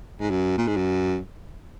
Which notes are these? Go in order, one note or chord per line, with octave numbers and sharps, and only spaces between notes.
G#2
F#2
A#2
G#2
F#2